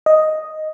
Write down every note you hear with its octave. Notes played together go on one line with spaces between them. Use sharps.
D#5